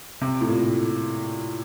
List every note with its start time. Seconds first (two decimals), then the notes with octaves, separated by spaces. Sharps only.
0.21 C3
0.41 A2
0.49 A#2